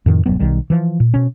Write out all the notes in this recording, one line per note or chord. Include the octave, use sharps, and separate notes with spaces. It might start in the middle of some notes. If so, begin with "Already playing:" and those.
F2 A2 D#3
E1 G2 F#3 B3
B1 D#3 G3
E3 F3
A#2
B2 C#4